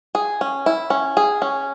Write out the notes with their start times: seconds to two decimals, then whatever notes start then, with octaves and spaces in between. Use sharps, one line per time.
0.15 G#4
0.41 C#4
0.66 E4
0.90 C#4
1.17 G#4
1.42 C#4